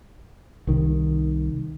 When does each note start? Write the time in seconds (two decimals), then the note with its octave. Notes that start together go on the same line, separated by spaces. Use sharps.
0.67 C2 D#3